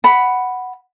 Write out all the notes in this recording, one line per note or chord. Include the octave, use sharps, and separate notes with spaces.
F#5 B5